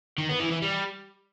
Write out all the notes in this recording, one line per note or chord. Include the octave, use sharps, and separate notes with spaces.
D#3
B3
E3
E3
G3